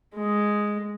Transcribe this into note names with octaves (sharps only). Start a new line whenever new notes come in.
G#3